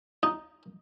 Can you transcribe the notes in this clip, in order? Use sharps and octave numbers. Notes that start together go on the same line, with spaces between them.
D#4